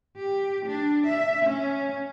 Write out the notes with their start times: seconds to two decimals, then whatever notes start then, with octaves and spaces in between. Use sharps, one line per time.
0.17 G4
0.66 D4
1.06 E5
1.45 C#4